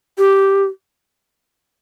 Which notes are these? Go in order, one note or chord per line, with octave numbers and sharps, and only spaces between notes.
G4